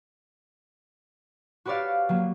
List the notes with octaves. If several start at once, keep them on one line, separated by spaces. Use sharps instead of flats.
F#4 G4 B4 C#5 D5 F5
F#3 A#3